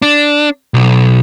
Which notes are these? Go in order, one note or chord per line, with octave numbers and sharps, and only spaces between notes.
D4
B1